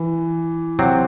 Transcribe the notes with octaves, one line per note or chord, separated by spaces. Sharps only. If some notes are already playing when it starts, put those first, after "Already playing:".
Already playing: E3
C3 F#3 C4